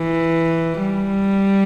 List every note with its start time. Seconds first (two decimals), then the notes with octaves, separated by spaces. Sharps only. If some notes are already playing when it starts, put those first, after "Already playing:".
Already playing: E3
0.81 G3